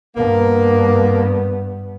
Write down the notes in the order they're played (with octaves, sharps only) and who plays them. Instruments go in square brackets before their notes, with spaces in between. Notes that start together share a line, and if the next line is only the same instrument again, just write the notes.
[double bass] G2 B3 [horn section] A#3